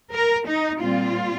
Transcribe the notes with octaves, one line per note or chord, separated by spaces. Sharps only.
A#4
D#4
A#2 G3 C4 F4